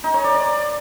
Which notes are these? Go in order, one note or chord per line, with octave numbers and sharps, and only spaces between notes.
D#4
C#5
D5
D5